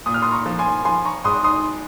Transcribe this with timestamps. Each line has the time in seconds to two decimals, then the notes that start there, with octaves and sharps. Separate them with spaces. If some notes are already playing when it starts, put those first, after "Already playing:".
0.06 A#2 D#6
0.14 F6
0.22 C6 D#6
0.32 A#5 C#6
0.46 F3
0.59 G#5 C6
0.85 F3 G#5 C6
1.05 A#5 C#6
1.24 G#2 C6 D#6
1.44 C6 D#6